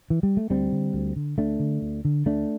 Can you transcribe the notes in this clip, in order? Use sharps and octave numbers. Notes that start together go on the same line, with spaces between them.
E3
G3
A3
D2 G3 C4
D3
D2
D3
D2 A3 D4
D3
D2
D3
D2 A3 D4